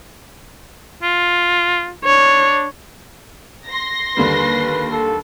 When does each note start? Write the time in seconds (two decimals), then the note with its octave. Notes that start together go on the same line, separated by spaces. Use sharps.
1.02 F4
2.05 D4 C#5
3.67 C6 A#6
4.17 D#2 D3 G3 B4
4.91 A4